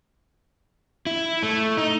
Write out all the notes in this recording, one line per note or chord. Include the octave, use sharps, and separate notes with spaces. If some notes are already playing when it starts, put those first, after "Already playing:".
E4
A3
D#4